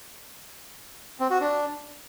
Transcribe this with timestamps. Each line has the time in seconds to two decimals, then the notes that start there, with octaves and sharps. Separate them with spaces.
1.20 C4
1.30 F#4
1.41 D4